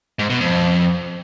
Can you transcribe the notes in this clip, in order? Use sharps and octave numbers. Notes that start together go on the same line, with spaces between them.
G#2
B2
F2